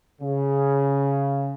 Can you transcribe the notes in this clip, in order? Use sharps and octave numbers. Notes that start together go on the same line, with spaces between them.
C#3